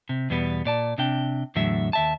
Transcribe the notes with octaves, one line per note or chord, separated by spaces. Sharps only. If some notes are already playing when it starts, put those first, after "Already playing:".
C3
E2 B2 G3 B3
A#2 D5 A5
C3 D4 G5
E2 A2 D3 F#3 E5
D#2 E5 A5